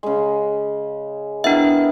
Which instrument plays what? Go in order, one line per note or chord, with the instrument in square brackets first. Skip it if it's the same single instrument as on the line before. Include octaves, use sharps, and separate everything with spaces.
[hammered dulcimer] C#3 G#3
[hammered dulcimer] B3 E4 A#4 [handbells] D4 E5